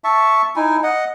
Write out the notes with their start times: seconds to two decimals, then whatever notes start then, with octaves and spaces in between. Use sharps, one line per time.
0.04 E5 A5 C#6
0.56 D#4 E4 G#5
0.83 D#5 F#5